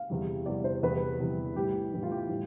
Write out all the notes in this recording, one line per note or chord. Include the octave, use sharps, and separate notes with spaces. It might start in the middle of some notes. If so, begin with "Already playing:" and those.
Already playing: F5
E2 C3 E3 G3
E2 C3 E3 G3 D5
C5
E2 C3 E3 G3 B4
E2 C3 E3 G3
A2 E3 G3 G4
A2 E3 G3
F4
G4
A2 E3 G3